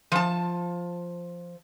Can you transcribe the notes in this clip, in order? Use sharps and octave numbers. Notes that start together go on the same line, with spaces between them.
F3 A5